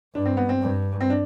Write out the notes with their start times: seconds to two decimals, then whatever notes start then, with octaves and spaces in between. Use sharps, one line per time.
0.15 G2 D4
0.25 C4
0.37 B3
0.49 C4
0.62 G2
1.00 C4
1.10 D4